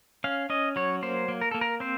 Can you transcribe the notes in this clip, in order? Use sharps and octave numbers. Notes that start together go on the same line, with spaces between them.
C#4 F5
C#4 D#5
F#3 C#5
A#3 C5
A#3
A#4
A#3 A4
A#4
C4 C5